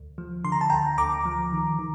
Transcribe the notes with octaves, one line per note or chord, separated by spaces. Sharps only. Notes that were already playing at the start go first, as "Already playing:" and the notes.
Already playing: D2
F3
D3 C6
A#5
A5
D2 G5 A#5
D2 A#5 D6
F3
D#3
D#3